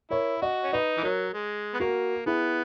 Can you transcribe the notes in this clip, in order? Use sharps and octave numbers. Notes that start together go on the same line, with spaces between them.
E4 A#4 C#5
F#4 D#5 F#5
C#4
D#4 B4 D#5
E3
F#3 A#4 C#5
G#3
B3
A#3 F#4 A#4
B3 E4 G#4